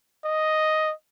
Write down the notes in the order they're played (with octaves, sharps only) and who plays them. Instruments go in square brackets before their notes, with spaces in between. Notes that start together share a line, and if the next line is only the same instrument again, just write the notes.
[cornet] D#5